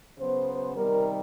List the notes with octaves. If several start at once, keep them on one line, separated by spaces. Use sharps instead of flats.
C#3 F#3 B3 C5
C3 D#3 G3 A#4